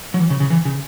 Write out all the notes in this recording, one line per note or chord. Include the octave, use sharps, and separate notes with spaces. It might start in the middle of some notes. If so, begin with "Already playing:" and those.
F#3
E3
C#3
C#3
E3
C#3